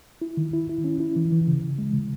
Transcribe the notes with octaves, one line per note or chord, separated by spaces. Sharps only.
E4
D#3
E4
E4
C#4
E4
E3
E3
C#3
C#3
G#3
C#3